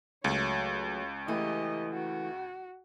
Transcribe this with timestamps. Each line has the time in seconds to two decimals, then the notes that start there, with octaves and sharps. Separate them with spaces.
0.24 C#2 F#3 A3 C#5
1.28 E3 A3 E4 G4 D#5
1.93 F#4